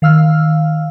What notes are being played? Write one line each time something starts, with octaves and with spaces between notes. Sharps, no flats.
D#3 F5 E6 F6